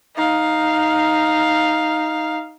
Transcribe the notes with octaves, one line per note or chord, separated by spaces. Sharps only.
D#4 F5